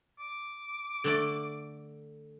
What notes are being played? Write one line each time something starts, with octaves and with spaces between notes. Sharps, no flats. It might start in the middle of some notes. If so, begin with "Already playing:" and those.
D6
D3 A3 D5